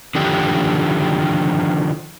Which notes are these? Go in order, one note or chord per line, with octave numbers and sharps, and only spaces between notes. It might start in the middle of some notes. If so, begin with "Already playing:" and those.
D3 D#3 F3 D4 G4